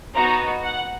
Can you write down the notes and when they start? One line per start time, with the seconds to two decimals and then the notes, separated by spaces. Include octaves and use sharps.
0.15 B3 D#4 F#4 A#5
0.63 F#5